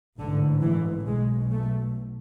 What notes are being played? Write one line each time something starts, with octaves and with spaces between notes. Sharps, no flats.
A1 G#2 D3
E3
B1 B2 G#3
A3